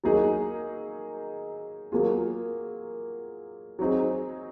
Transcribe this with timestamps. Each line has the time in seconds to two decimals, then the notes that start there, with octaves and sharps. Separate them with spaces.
0.04 F#3 A#3 D#4 G#4
1.92 F#3 A#3 F4 G#4
3.79 F#3 C4 D#4 G#4